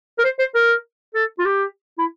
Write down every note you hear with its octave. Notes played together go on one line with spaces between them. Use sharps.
A#4
C5
C5
A#4
A4
F4
G4
E4